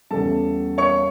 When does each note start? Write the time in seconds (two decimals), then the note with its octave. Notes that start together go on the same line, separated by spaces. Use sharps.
0.11 E2 C#3 G3 A4 A5
0.78 C#5 C#6